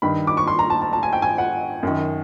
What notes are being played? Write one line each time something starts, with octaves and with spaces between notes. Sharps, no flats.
G2 D#3 B5
D6
C#6
C6
A#5
A5
A5
A5
G#5
G5
G#5
F#5
F#2 D#3